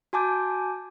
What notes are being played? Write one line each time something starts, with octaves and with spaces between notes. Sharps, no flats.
F#4 G#5 A5 D6 G6